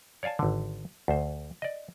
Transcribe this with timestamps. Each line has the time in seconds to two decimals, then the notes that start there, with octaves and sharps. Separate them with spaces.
0.23 C#5 D5 F5 G#5 A5
0.39 G#1 D3
1.08 D2 C5
1.62 D5 D#5